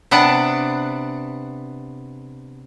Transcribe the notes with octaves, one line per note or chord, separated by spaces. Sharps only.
C3 B3 D4 F#5 A5